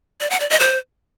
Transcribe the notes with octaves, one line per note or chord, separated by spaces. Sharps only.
D5
F#5
D5
D#5
C5